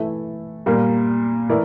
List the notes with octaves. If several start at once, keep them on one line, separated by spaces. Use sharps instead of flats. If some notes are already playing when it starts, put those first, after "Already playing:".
Already playing: E3 A3 E4 A4
A#2 G3 A#3
E3 A3 E4 A#4 D5